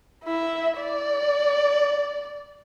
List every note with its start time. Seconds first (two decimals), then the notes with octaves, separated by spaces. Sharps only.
0.24 E4 E5
0.79 D5